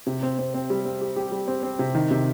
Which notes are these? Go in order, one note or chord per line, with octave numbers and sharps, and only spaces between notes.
C3
C4
C4
C4
G3
C4
G4
G4
G3
C4
C4
C3
D#3
C3